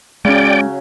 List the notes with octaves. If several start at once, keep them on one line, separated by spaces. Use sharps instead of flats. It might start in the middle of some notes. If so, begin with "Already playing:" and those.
C#3 F#3 G#3 C#4 D5 G5